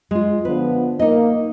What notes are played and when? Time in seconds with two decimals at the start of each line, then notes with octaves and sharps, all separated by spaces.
0.11 G#3 F4
0.45 D3 F3 B3 B4
0.99 A#3 D#4 D#5